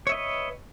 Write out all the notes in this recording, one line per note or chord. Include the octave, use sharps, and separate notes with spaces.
B4 C#5 D#5 E5